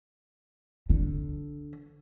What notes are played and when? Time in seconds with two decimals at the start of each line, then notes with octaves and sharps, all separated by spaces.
0.89 D3